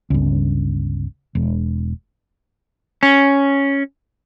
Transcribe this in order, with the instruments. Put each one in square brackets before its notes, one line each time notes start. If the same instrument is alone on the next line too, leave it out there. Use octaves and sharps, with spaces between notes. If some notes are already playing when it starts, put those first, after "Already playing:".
[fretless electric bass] G1 C#2
E1
[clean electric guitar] C#4